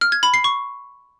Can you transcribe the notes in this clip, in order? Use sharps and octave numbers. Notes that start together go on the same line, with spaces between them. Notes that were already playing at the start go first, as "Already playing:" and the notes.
F6
G#6
B5
C7
C#6